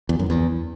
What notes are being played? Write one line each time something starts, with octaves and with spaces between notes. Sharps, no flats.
E2
F#2
E2